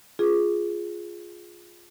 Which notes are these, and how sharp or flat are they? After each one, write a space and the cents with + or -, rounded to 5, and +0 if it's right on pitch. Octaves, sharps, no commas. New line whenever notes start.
F4 +0 G#4 +0